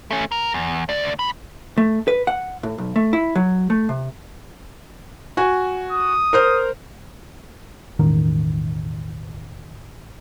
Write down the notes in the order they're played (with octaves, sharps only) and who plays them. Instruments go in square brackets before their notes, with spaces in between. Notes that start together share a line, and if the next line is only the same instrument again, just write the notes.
[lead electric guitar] A3 C#4
A#4
E2
D2 D5
F#2 B5
[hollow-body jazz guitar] A3
B4
F#5
A2
B1
A3
E4
F#3
A3
C3
[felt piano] F#4 G#5
[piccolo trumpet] D#6
[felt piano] A#4 C5 F6
[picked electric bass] E1 A1 D#3